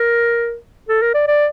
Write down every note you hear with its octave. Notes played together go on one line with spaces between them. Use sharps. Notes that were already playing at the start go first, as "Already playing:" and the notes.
Already playing: A#4
A4
A#4
D5
D5